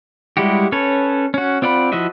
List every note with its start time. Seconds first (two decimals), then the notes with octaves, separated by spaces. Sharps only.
0.37 G3 G#3 E4 F#4 G4
0.72 C#4 A4 B4 C#5
1.34 C#4 F#4
1.62 C4 F4 D5 F#5 B5
1.92 F3 E4 F#4 D#5 E5